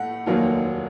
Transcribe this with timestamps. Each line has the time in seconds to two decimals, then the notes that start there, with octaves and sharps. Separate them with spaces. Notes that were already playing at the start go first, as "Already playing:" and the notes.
Already playing: A2 A3 F#5
0.26 F1 D#2 D#3 F#3 A#3